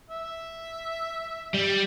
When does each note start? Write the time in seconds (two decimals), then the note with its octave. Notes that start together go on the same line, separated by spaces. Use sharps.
0.10 E5
1.54 G3